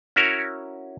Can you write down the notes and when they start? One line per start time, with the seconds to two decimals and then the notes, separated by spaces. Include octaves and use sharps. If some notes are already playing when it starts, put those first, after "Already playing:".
0.16 C#4 E4 F#4 A#4 C#5